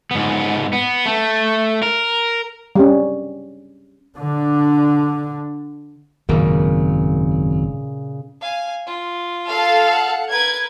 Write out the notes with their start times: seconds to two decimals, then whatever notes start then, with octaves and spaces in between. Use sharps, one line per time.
0.11 G#2 B3
0.73 B3
1.06 A3
1.83 A#4
2.75 G3 C#4
4.18 D3 D4
6.29 G#1 F#2 A#2 C#3 A#3
8.41 F5 G#5
8.87 F4
9.50 A4 F5
9.92 F#5
10.31 A#4 B4 G#6